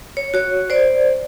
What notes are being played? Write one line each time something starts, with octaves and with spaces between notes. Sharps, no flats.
C#5
F#4 C#5
C5 D5